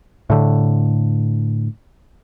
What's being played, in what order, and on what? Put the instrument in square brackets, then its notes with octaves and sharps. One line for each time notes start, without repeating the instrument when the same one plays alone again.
[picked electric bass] A2 D3